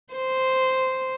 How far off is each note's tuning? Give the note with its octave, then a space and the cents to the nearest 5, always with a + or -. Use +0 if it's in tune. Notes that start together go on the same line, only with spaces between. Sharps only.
C5 -5